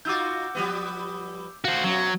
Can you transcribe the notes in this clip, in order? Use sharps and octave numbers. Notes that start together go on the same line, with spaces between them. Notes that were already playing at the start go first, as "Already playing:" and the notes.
D#4 F4 F#4 D6 E6 G6
F3 G3 B3
F#4 C5 F5
F#2 B2 F#3